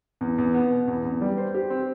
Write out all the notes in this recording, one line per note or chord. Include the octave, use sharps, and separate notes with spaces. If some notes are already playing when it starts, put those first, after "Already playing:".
E2
E2
B3
B2
E2
E2
G3
C5
G4
C4